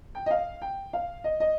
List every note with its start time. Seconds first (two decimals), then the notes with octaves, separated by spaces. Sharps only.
0.15 G5
0.26 D#5
0.31 F5
0.62 G5
0.93 F5
1.24 D#5
1.40 D#5